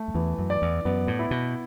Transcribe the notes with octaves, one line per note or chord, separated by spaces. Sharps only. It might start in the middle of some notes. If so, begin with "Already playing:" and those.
Already playing: A3
F#2
E2 E3
F#2
D5
E2
F#2 B3
A2
E4
B2